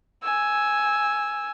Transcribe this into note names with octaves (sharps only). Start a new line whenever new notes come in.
G#5 E6